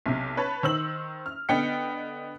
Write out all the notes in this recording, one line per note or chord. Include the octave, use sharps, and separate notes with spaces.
B1 C3
B4 C#5 A5
D#3 C5 E6 F#7
F6
D3 B3 D#5 G5 C#7